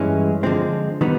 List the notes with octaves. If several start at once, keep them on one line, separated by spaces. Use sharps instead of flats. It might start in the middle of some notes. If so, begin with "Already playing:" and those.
Already playing: G2 E3 G#3 C#4
D3 F3 G#3 C4
D#3 G3 B3 D#4